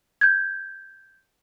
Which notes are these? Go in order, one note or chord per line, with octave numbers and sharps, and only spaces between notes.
G6 G#6